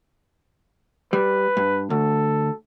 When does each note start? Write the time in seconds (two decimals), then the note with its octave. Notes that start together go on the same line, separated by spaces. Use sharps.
1.13 G3 B4
1.57 G2
1.90 D2 A4